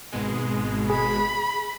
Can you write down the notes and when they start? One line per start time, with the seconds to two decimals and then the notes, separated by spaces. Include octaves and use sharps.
0.12 G#1 B2 G#3
0.90 G#4 B5